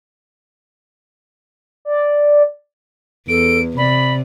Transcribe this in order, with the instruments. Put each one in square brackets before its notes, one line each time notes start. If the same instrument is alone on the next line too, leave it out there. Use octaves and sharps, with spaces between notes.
[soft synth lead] D5
[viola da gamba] E2 [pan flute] A4 [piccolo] D7
[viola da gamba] C3 [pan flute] D5 [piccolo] B5